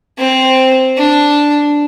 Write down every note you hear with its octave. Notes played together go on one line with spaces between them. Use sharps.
C4
D4